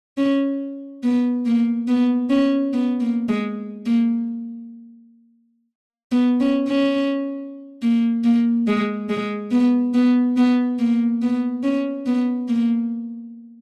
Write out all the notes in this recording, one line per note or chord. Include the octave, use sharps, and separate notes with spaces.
C#4
B3
A#3
B3
C#4
B3
A#3
G#3
A#3
B3
C#4
C#4
A#3
A#3
G#3
G#3
B3
B3
B3
A#3
B3
C#4
B3
A#3